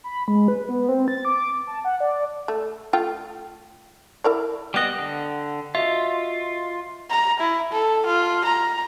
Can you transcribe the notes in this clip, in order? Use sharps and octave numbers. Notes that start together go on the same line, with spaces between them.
B5
G#3
B4
B3
C4
A6
D6
A5
F#5
D5
A3
A3 F4 G5
E4 A#4 D5
G3 B3 D#5 F#5 G5 F#6
D3
F4 F#4 D#5 E5
A#5
E4
A4
F4
A#5